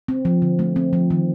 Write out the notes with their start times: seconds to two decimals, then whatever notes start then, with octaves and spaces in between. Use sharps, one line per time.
0.08 C4
0.25 F3
0.42 D3
0.59 A3
0.76 C4
0.93 F3
1.10 D#3